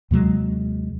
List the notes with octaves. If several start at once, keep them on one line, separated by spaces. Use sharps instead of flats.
D#2 C3 F#3 G#3